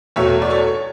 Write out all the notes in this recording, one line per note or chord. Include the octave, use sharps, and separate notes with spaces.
E2 B2 A3 C#5 E5
D5
A4 C#5